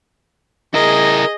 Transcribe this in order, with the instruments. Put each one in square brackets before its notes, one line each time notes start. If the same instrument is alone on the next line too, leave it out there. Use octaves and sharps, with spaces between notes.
[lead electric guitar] E4 A#4 [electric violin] G#4 D#5